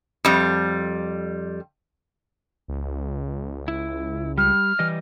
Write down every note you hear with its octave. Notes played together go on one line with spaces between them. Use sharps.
F2 G3
C#2
E4
G3 F6
E3 G3 D#5